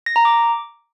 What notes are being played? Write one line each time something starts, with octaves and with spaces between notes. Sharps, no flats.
A#6
A#5
D6